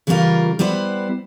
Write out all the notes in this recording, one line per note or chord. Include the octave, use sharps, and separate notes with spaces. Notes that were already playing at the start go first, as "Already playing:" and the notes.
C#3 E3 G3 C#4 F4 A#4
G3 B3 E4 B4 C5